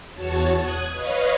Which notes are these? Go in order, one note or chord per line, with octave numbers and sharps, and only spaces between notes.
E2 F#4 C#5 A5
D#6 F#6 G#6
B4 C#5 D#5 F5